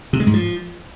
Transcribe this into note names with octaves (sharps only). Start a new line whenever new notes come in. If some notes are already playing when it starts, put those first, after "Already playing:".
C3
G#3
G#2
F3